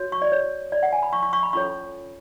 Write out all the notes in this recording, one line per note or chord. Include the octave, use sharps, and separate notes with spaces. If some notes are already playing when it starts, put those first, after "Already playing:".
Already playing: F#4 C#5
C#6
D5
C#5
D5
F#5
G#5
B5
C#6
C#6
C#6
B5
C#4 F4 A4 C#5 C#6